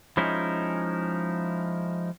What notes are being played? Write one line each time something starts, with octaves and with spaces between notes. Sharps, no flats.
F3 G#3 C#4 D#4 E4